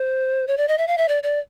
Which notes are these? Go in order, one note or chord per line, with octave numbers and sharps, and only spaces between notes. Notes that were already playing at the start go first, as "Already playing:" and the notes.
Already playing: C5
C#5
D5
D#5
E5
F5
E5
D5
D5